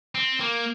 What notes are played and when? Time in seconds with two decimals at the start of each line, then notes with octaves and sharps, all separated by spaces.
0.15 C4
0.40 A#3